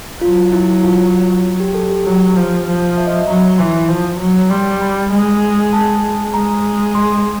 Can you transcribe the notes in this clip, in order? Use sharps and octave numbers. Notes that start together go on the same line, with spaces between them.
F#3 F4
E4
F4
G4
A4
G4
F#3 G4
F3
F3
E5
D#5
E5
F#3 A#5
E3 C6
F3
F#3
G3 C6
B5
G#3
A5
G#3 A#5
C6